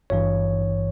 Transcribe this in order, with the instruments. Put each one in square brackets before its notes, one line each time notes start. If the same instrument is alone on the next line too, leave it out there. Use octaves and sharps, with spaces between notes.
[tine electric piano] G#1 G2 E3 C#5